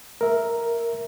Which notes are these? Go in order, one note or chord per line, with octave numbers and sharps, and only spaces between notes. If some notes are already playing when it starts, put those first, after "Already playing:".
A#4 E5